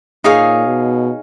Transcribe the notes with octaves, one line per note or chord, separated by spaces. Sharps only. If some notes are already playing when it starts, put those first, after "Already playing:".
A#2 D#4 G#4 C#5 F5
B2